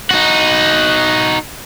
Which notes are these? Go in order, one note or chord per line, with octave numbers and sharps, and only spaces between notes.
D#4 F#4